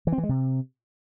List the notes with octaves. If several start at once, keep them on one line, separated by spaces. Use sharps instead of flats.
E3
C4
E3
G#3
C3